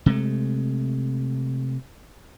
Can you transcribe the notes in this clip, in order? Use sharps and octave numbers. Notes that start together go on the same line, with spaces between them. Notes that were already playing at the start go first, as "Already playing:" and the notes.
C3 G#3 A3